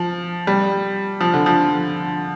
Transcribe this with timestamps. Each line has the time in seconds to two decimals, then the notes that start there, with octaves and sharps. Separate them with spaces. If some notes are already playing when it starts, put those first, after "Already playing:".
Already playing: F3
0.47 G3
1.21 F3
1.34 D3
1.46 F3